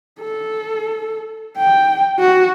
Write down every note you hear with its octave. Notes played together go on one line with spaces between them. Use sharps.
A4
G5
F#4